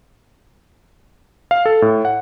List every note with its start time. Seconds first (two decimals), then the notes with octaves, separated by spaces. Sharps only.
1.51 F5
1.66 A4
1.82 A2
2.05 F#5